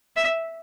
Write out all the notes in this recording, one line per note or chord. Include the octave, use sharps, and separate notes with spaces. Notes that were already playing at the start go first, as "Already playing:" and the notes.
E5